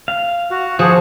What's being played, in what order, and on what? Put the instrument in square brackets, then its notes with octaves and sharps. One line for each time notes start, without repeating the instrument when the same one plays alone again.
[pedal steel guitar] F5
[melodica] F#4
[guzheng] F3 [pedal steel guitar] F#4 [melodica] G#4